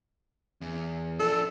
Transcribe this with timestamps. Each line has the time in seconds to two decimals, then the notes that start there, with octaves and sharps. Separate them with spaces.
0.61 E2
1.20 F3 D4 A4